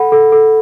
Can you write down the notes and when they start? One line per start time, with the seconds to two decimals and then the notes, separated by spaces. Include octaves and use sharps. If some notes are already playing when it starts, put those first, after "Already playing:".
Already playing: A4 F#5 B5
0.12 A4
0.32 A4